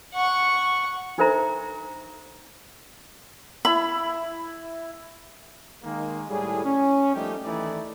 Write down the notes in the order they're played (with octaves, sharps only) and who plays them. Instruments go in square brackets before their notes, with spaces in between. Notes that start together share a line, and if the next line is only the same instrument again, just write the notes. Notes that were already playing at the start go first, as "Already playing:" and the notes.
[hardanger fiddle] F#5 C#6
[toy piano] D4 D#4 A4 C5 E5 A#5
[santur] E4 E5 [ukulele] B5
[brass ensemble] D#3 G#3 A#3
A2 G3 G#4
C#4
F3 G3 A3 A#3 D#4 G4
D#3 E3 A3 D#4 E4 D5